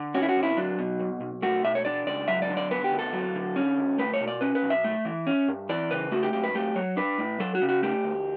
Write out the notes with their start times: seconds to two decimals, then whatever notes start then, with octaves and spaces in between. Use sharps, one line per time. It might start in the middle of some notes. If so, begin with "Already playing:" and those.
Already playing: D3
0.14 C#4 F#4
0.22 E4
0.29 F#4
0.37 D2
0.43 E4
0.57 F#3 D4
0.79 B2
0.99 B1
1.21 B1
1.42 A3 F#4
1.64 B2 E5
1.75 C#5
1.85 D4 D5
2.07 C#2 D5
2.28 F#3 E5
2.42 D5
2.50 D3
2.57 D5
2.71 B3 B4
2.84 G4
2.92 D2
2.99 A4
3.13 F#3
3.35 D3
3.56 C#4
3.78 D2
3.98 A3 B4
4.14 C#5
4.20 B2
4.28 D5
4.41 C#4 B4
4.55 B4
4.62 B1
4.70 E5
4.84 A3
5.05 E3
5.27 C#4
5.48 G2
5.69 E3 D5
5.91 C#3 B4
6.11 A3 F#4
6.23 G4
6.33 F#2 G4
6.44 B4
6.55 A3 G4
6.75 F#3 C#5
6.97 D4 B4
7.18 A2
7.40 F#3 A4
7.55 F#4
7.62 C#3
7.69 F#4
7.83 A3 G4
8.04 D2